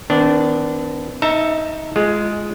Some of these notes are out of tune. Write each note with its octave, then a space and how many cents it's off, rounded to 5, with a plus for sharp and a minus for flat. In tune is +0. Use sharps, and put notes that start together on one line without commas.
D#3 +35 B3 +45 D4 -10
D#4 +20 E5 +0 A5 +45
G#3 +5 F4 -10